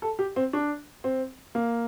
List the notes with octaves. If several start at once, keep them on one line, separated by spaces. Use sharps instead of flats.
A4
G4
C4
D4
C4
A#3